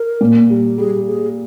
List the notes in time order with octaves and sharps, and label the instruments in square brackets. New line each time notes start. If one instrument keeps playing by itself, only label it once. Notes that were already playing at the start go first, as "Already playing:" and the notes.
Already playing: [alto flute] A#4
[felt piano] A#2
G3
[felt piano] G3 [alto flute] G#4
[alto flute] G#4